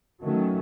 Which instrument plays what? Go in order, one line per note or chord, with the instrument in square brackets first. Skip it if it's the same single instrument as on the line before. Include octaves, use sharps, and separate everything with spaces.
[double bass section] D#3 F#3 A3 C#4